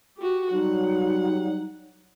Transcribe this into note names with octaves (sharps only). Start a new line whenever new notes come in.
F#4 G4
F#3 G3 D#4 F#5